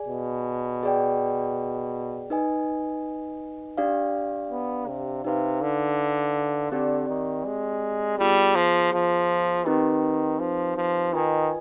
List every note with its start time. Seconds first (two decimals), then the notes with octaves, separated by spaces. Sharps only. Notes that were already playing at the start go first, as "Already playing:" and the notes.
Already playing: G#4 D5 G#5
0.09 B2
0.83 G#4 D5 G5
2.30 D#4 B4 D#5 G#5
3.77 D4 G4 D5 F5
4.50 B3
4.88 C3
5.24 C3 D#4 B4 F5
5.61 D3
6.72 D3 C4 G4 D5
7.08 D#3
7.45 G#3
8.18 G3 B3 F4 G#4
8.55 F3
8.93 F3
9.66 D#3 C4 D#4 G4 B4
10.39 F3
10.76 F3
11.13 D#3 F4 B4 D#5 G#5